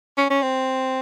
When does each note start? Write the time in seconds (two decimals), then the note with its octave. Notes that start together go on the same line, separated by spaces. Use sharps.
0.18 C#4
0.30 C#4
0.42 C4